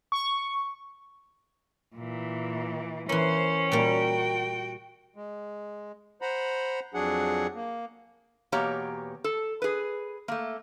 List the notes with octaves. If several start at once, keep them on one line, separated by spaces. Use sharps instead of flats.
C#6
A#2 E3
E3 A#3 C#4 C5
A#2 G3 A#3 F#4 G5
G#3
C5 F#5 A#5 B5
F2 F#3 D4 G#4 F#5
A#3
E2 B2 A#3 G4 C#5 A#5
A4
G#4 B4
A3 A#3